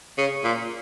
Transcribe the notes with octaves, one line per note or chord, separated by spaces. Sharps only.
C#3
A#2